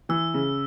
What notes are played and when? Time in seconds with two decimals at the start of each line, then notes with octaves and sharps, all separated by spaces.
0.09 E3 E6
0.34 C#3